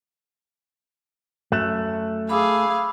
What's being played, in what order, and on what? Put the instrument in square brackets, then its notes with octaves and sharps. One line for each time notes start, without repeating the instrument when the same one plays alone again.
[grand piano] F#2 F#6 E7 [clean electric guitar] A3
[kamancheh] G#4 F5 [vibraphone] B5 D6 E6